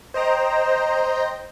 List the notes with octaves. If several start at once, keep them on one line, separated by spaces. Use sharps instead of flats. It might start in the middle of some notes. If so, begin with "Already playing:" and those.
C5 D#5 G5 A#5